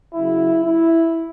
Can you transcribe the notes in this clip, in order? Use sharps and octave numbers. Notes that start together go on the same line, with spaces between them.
C#3 F#3 E4
E4